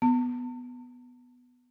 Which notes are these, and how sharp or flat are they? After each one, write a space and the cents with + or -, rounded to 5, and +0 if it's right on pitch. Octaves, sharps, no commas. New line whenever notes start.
B3 +0 A5 +45